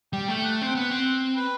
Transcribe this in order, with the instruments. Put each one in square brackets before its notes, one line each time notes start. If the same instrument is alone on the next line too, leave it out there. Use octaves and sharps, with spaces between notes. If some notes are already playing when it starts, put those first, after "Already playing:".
[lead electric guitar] G3 [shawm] G5
[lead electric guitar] A3 [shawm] G5
[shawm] F#5
[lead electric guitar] C4 [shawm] G5
[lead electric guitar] B3 [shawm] F#5
[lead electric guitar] C4
[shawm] B4